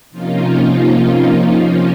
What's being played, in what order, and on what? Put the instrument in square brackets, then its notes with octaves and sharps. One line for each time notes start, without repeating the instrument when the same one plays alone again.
[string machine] C3 F3 A#3 C#4 D#4 F4
D#4 F4